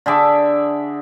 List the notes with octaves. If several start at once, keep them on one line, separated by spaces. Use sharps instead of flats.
D3 G#4 E5 D6